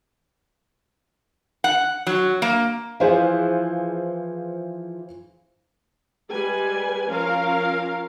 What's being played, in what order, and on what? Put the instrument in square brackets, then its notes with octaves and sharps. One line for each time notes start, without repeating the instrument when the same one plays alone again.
[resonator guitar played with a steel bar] F#5
F#3
A#3
[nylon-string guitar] E3 F3 E4 [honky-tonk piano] G#4 C5 F5
[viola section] G3 G#3 B4 G#5
F3 C#4 A#4 F5